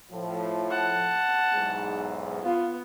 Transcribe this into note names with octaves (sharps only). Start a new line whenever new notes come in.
A2 F3
F#5 A5
B1 E2 G#2
B3 F4